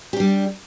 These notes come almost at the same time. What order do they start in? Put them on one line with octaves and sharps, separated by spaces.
G4 D4 G3